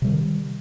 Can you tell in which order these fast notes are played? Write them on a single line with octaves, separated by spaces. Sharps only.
C3 G3 D#3